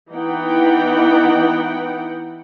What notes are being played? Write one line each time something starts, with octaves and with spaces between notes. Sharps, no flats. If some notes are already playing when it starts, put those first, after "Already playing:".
E3 B3 D#4 F#5 G5